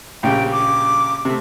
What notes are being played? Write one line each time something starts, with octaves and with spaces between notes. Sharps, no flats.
A#1 C#3 G4 G5
D6
C3 A3